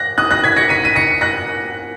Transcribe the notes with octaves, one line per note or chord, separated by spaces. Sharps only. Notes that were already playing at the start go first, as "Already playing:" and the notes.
Already playing: F#6 A#6
D#6 F#6
F#6 A#6
G#6 B6
A#6 C#7
B6 D#7
D#7
A#6 C#7
F#6 A#6